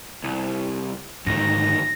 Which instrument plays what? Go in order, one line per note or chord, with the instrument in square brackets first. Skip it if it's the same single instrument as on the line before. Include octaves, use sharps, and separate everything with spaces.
[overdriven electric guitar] C2
[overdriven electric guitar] D2 D#3 [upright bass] G#2 [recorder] A#6